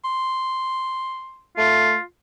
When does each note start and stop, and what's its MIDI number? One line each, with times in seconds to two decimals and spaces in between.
0.05 1.43 84
1.58 1.95 57
1.58 2.01 65